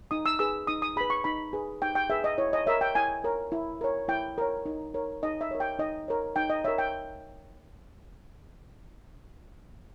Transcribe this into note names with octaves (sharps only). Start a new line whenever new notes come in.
D#4 D#6
E6
G#4 B4 E6
D#4 D#6
D#6
G#4 B4 B5
C#6
D#4 B5
G#4 B4
D#4 G5
G5
G#4 B4 E5
D#5
E4 C#5
D#5
A#4 C#5 E5
G5
E4 G#5
A#4 C#5
E4
A#4 C#5
E4 G5
A#4 C#5
D#4
A#4 C#5
D#4 D#5
E5
A#4 C#5
G5
D#4 D#5
A#4 C#5
D#4 G5
D#5
A#4 C#5 E5
G5